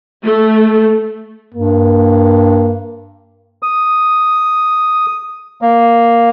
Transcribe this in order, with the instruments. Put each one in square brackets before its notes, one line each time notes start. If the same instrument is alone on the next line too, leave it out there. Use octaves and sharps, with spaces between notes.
[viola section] A3
[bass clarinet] G2 [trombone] A#3
[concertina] D#6
A#3